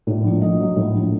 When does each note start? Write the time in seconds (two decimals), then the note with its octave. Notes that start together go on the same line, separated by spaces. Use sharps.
0.07 A2 D5
0.24 A#1
0.41 A#1 D#5
0.60 F#3
0.76 A2
0.95 A#1